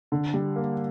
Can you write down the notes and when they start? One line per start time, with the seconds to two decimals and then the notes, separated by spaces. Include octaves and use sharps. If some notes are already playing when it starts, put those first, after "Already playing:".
0.12 D3
0.34 G3
0.56 A#3